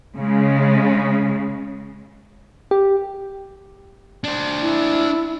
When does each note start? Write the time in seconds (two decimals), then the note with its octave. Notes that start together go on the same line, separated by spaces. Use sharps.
0.17 C#3 G#3
2.71 G4
4.24 D4 C5
4.61 E4